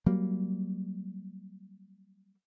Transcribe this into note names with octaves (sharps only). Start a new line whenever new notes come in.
F#3 G3 A#3